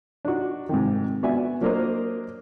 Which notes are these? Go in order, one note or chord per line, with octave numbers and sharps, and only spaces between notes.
D4 D#4 F#4
G#2 C3 D#3
B3 F#4 D5 E5 G#5
F#3 A#3 D4 A#4 C5 D#5